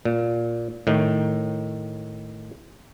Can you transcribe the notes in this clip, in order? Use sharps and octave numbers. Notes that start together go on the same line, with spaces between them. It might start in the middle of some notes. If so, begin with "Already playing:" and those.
A#2
A2 D#3